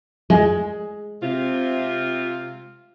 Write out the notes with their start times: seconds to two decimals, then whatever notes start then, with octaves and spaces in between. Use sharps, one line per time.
0.30 G#3
1.22 C3 F4